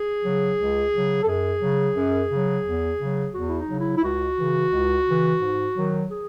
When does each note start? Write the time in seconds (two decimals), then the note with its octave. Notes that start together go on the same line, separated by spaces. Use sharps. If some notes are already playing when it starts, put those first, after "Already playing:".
Already playing: G#4
0.24 C#3 F#3
0.59 C#2
0.93 C#3 F#3
1.23 A4
1.27 F#2 G#4
1.61 C#3 F#3
1.97 F#2
2.31 C#3 F#3
2.66 E2
3.00 C#3 F#3
3.34 E2 F#4
3.47 E4
3.57 D#4
3.69 C#3 F#3
3.79 E4
3.97 E4
4.03 C#2 F#4
4.38 C#3 E3
4.72 C#2
5.06 C#3 E3
5.40 G#2
5.76 D#3 F#3
6.10 G#4